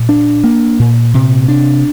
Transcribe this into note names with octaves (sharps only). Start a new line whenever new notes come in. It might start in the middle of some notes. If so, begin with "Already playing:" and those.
Already playing: A#2
D4
A#3
A#2
C3
D4